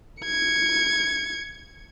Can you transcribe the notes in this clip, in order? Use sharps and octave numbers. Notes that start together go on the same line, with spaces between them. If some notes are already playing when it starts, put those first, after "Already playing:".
G#6 C#7